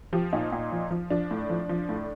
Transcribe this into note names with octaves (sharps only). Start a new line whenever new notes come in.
F3 G4
A#2 D#4
A#2
F3
F3
F3 D4
A2
F3
F3
A2